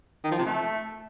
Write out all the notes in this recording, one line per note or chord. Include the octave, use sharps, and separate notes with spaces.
D#3
F3
C3
A3